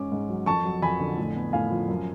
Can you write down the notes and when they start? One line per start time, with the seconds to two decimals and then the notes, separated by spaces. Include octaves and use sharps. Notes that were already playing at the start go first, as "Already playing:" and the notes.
Already playing: G#2 C#4 D6
0.12 G#2
0.29 F#3
0.46 F2 A5 C#6
0.65 F#3
0.82 F2 G#5 B5
1.00 D3
1.18 A2
1.36 B3
1.53 A2 F5 G#5
1.71 F3
1.89 F#2